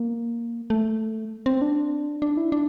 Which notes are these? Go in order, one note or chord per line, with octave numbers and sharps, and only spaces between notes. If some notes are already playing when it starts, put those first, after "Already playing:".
Already playing: A#3
A3
C4
D4
D4
E4
D4